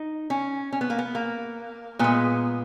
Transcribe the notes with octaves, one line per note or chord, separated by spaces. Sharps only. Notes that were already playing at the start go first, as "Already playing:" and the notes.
Already playing: D#4
C#4
C#4
B3
A#3
B3
A#3
A#2 G#3 B3